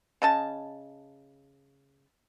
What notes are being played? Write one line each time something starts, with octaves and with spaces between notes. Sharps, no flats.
C#3 D#5 A5